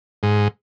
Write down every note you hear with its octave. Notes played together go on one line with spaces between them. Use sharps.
G#2